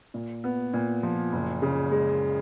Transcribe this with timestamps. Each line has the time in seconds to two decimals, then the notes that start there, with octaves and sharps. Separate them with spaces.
0.14 A#2
0.44 B3
0.74 A#2
1.03 F3
1.32 F#1
1.62 C#3
1.91 G#3